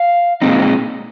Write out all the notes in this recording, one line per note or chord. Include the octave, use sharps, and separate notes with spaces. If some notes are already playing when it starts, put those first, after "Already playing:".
Already playing: F5
A#2 G#3 C4 D#4